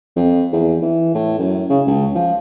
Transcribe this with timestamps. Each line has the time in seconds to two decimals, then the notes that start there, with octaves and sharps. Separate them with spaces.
0.16 F2
0.53 E2
0.82 E3
1.15 A2
1.39 F#2
1.69 C#3
1.87 C#2
2.15 F3